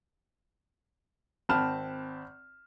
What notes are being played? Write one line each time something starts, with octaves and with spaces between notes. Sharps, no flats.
G#1 C4 A5 B5 F6 E7